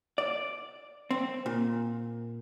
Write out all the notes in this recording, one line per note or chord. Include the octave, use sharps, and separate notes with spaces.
D5
C4
A#2